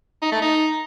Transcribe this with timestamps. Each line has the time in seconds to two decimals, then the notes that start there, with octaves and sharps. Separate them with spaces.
0.22 D#4
0.32 A3
0.42 D#4